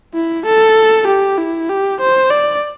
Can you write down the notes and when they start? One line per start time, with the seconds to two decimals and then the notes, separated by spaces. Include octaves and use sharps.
0.14 E4
0.46 A4
1.07 G4
1.38 E4
1.69 G4
2.01 C5
2.31 D5